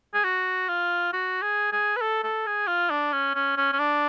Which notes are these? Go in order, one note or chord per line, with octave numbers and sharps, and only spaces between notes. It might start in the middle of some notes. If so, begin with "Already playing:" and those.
G#4
F#4
F4
F#4
G#4
G#4
B4
A4
A4
G#4
F4
D4
C#4
C#4
C#4
C#4
D4